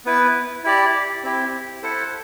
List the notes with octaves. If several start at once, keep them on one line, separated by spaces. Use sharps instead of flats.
B3 E4 B4
E4 G4 D5
C4 E4 G4
E4 A4 C5 F#5